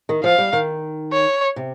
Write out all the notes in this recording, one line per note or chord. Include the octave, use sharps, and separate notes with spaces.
D#3
F3 F5
G3
D#3
C#5
C3